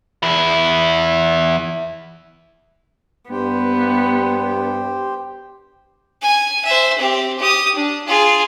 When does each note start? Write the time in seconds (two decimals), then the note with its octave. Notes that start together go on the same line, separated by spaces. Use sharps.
0.23 E2 E4
3.30 G2 B3 G4 C5 G5
6.23 G#5
6.65 C5 E5
6.98 C4 G4
7.39 G4 D#6
7.75 D4
8.07 F4 G#4